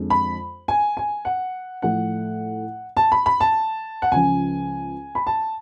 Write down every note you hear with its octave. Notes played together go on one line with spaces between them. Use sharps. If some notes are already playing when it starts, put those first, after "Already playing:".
Already playing: F2 D3 G#3
B5
G#5
G#5
F#5
A2 F3 A3 F#5
A5
B5
B5
A5
F#5
C#2 C#3 F3 G#5
B5
A5